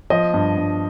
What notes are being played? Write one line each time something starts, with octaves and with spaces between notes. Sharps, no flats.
F3 D#5
G2
G2